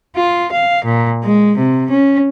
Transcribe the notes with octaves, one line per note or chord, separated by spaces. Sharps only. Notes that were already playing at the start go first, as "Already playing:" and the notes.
F4
F5
A#2
G#3
C3
C#4